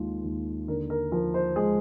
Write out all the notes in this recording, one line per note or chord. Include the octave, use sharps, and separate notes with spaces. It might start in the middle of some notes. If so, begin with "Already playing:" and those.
Already playing: D#2 D#3 G#3 F4
D#2
D3 A#4
A#4
F3 A#4
C5
G#3 G#4